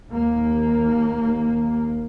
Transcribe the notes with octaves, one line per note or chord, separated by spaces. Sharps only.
D#2 A#3